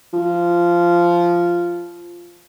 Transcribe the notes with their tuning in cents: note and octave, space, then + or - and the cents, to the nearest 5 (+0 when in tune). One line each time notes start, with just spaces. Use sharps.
F3 -10